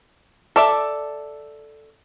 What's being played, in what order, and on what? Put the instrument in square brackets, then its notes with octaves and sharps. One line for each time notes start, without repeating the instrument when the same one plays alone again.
[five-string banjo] A4 D5 E5